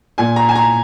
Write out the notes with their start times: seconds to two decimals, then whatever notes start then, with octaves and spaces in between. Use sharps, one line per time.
0.18 A#2 G#5
0.36 A#5
0.49 G#5
0.55 A#5